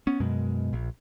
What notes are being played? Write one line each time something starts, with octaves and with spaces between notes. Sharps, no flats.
B3 C#4
F#2 B2 G#3
A#1